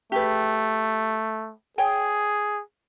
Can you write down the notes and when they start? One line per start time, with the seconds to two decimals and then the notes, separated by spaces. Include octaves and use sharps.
0.12 A3 G4 G#4 B4
1.78 G#4 C#5 G5 G#5